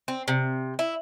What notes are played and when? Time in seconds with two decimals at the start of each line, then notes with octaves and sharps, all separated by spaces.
0.08 C4
0.28 C3
0.79 E4